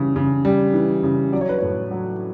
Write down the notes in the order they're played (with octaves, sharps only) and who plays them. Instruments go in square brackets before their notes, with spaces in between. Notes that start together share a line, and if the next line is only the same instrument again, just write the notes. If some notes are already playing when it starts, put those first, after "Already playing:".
Already playing: [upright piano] C#3 E3 G3
C#3
G3
E3
C#3
F#3 D5
C#5
B4
A2 C#5
F#3